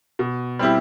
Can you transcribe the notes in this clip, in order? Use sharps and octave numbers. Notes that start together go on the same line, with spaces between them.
B2
G3 C4 E4 G4